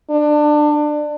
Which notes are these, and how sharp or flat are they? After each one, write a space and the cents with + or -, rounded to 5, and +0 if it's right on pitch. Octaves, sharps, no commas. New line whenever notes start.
D4 +25